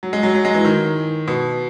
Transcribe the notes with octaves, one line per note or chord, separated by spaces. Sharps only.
F#3
G#3
F#3
F#3
G#3
E3
D#3
B2